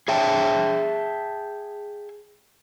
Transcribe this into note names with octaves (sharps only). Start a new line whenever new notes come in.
G#4 E5 G5 A5